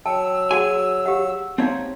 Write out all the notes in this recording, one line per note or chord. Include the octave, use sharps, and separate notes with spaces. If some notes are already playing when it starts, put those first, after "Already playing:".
F#3 G5 A5 E6
F#4 G#4 F#5 G#5
G4 F5 F#5
C4 D#4 C#5 F5 A#5